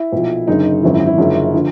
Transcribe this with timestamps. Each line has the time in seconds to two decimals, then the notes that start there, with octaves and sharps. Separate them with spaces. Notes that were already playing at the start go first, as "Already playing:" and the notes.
Already playing: E4
0.12 B1 A#2 F3
0.48 F#1 F#2 D3 D#4
0.83 G#1 F#2 D3 F3 E4
0.94 E4
1.06 E4
1.18 F#1 F#2 D3 F3
1.54 D3 F3